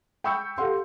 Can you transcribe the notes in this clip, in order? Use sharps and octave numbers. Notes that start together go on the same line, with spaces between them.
G5 B5 C#6 E6 G6 C#7
G4 A4 F5 F#5 C6